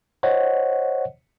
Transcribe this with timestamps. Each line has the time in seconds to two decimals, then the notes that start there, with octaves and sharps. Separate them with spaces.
0.23 C5 C#5 D#5 F#5